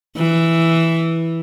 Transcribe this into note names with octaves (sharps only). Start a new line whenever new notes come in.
E3